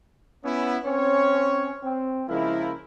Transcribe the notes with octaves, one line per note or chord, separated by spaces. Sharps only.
B3 C#4 E4
C4 C#4 C#5
C4
C#3 F3 G#3 A#3 E4 A#4